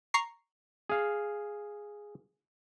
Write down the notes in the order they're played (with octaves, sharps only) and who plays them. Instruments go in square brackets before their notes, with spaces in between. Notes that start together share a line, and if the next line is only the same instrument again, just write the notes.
[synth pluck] A#5 C#6 C7
[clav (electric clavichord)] G#4 F5